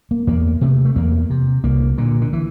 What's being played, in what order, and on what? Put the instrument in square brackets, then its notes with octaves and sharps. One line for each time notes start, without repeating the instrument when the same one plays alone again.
[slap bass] A#3
E2 A#3
C3 A3
A3
E2 A#3
C3
C2 A#3
A#2 D3
D3
E3